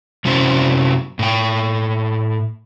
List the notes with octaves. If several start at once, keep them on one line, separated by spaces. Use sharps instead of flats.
F#2 C3 C#4 E4 F#4 C5
A2 G5